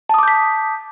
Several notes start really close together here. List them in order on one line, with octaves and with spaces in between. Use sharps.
A5 D#6 D6 G6 B6